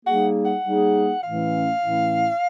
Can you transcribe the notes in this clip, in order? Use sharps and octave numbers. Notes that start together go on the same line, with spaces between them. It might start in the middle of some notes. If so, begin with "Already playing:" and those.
G3 A#3 D#4 G#4 F#5
F#5
G3 A#3 D#4 G#4
A2 E3 A3 C#4 E4 F5
A2 E3 A3 C#4 E4